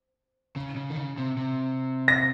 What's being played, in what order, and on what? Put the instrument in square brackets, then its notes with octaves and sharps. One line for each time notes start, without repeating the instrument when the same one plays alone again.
[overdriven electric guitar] C#3
C#3
D#3
C#3
C3
C3
[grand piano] A#6